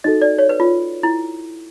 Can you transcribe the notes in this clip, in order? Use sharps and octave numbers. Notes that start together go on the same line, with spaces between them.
D#4 F#4 A4 D#5
D5
C#5
B4
F4
E4